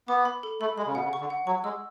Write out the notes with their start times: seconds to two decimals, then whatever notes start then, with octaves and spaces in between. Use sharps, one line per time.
0.08 B3 D6
0.25 B5
0.43 A4
0.61 A3 B5
0.77 G#3 B5
0.86 C#3
0.95 B2 F#5
1.04 C#3
1.13 C#6
1.20 D3
1.30 F#5
1.46 F#3 C#6
1.64 G#3 E6